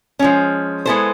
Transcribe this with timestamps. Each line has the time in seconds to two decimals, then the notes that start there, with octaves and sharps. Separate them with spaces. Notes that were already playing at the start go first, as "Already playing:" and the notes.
0.19 F3 G#3 C#4
0.85 G#3 B3 E4 A4 C5